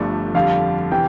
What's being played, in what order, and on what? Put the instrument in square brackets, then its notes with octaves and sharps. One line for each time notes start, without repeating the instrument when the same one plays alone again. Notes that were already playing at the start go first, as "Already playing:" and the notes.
Already playing: [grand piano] G1 G2 F3 A3 D4
[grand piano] F2 D3 G3 [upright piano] F5
[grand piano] C3 E3 [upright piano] G5